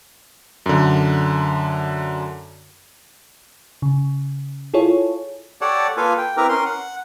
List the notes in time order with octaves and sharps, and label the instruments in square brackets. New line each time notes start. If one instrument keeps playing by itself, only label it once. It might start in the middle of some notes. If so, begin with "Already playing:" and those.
[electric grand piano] F#2 D3
[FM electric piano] C#3
E4 F4 G#4 A4 C#5
[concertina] G4 A4 C#5 D5 F#5 A5
A#3 F4 A4 B4 F5 G#5
G5
C4 E4 G4 A#4 B4 A#5
C#4 A#4 C6
F#5